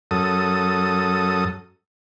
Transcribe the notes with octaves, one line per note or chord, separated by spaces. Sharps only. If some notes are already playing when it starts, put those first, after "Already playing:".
F#2 A4 D#6